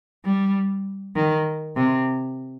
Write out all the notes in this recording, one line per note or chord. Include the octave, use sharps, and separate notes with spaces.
G3
D#3
C3